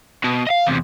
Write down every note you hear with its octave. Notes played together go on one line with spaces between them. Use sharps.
B2
D#5 F5
E2 C3